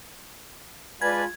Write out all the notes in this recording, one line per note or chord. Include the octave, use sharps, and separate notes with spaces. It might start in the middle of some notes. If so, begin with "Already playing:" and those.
G#3 F4 B4 D5 G#5 A5 B5 G#6